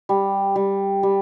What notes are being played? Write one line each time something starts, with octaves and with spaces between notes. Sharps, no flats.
G3
G3
G3